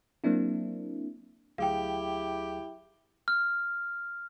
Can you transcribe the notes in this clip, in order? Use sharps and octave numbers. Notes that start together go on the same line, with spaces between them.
F#3 A#3 C4 D4 E4
D2 F#3 E4 G4 G#4 F5 G5
F6